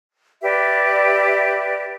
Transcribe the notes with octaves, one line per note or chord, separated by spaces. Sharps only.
G4 B4 D5 E5